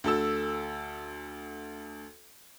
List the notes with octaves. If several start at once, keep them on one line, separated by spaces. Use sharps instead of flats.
D2 A4 E6